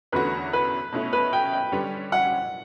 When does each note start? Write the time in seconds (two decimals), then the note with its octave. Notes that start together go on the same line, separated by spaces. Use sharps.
0.12 E2 D3 A3 C#4 F#4 B4
0.53 B4
0.93 B2 A3 C#4 E4
1.13 B4
1.33 G5
1.53 G5
1.72 D3 G3 C#4 G4 B4
2.12 F#5